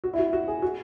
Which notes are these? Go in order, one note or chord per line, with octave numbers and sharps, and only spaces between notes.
F#4
E4
F#4
F#4
G#4
F#4